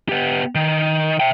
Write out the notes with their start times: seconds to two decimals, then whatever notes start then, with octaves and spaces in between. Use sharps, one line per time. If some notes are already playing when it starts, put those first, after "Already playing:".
0.09 B3 G4
0.55 D#3
1.20 E5 G5